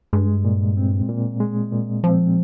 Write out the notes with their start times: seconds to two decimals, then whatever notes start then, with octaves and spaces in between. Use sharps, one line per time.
0.13 G2 G#3
0.45 A#2
0.77 C4
1.09 A#2
1.40 G#3
1.72 A#2
2.04 F3 C4